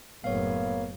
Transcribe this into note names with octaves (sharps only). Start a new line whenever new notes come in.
F#1 A2 A#3 B3 C#5 F5